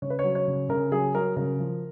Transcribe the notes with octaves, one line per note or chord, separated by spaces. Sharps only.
C#3 C#5
B4
C#5
F#3
C#5
C#3
C#3 A#4
F#3 G#4
F#3 A#4
C#3 A#4
F3